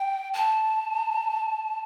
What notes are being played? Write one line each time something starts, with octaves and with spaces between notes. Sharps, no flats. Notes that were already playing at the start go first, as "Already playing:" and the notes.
Already playing: G5
A5